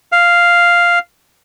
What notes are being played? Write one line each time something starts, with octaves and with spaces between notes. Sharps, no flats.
F5